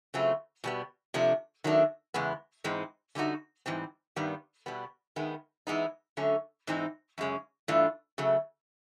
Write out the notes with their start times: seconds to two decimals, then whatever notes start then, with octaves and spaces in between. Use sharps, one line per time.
0.14 C#3 F#3 A3 C4 F4
0.64 B2 G3 B3
1.14 C3 F3 A3 D4
1.64 D#3 F#3 A3 D4
2.14 E2 C#3 G#3 B3
2.64 G#2 E3 G#3 C4 D#4
3.15 D3 G3 A#3 D#4 F#4
3.66 G#2 E3 G3 C4
4.16 G2 D#3 G3 B3
4.66 B2 G3 B3
5.16 D#3 G#3 B3
5.67 E3 G#3 B3 D#4
6.17 D3 F#3 A3 C#4
6.67 G#2 E3 G#3 C4 D#4
7.18 F#2 C#3 G#3 C#4
7.68 G2 E3 A3 D4 F4
8.18 C#3 F#3 A3